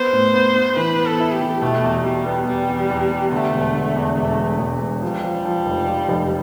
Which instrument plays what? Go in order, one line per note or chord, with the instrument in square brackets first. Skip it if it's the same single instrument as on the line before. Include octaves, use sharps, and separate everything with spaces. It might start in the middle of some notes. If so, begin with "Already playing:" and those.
Already playing: [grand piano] B3 [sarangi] C5
[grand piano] A2
B3
B3
[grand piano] E3 [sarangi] B4
[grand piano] B3
[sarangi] A4
[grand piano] E4
[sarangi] G4
[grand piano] E3
[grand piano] B2 [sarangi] A3
[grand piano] E2
[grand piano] E2 [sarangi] G3
[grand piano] B3
[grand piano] E2 [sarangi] G3
[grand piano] E2
E2
B3
[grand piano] D3 [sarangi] A3
[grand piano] E1
D3
E2
[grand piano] E1 [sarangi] A3
[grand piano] E1
E1
E1
[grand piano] F3 [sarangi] G3
[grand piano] F3
F3
F1
F3
F1